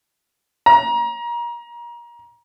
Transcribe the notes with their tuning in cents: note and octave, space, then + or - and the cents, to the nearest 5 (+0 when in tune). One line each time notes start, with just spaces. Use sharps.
A#5 +30